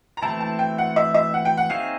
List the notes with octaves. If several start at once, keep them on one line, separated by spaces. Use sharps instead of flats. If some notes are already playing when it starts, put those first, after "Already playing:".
A#5
E3 A3 C4 E4 A5
A5
G5
F#5
E5
E5
F#5
G5
F#5
C4 D#4 G#4 C#5 E5 F5